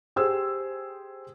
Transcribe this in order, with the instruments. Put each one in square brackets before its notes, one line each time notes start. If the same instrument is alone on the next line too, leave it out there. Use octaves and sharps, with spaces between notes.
[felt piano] G4 G#4 C5 E6